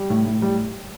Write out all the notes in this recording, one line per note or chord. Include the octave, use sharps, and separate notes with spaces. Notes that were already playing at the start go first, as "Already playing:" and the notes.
Already playing: G3
A2
A2
G3